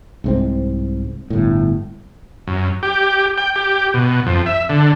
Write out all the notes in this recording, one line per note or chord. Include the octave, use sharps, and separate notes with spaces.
C2 G#2 C4
G1 A2
F#2
G4
G5
G4
B2
F2
E5
D3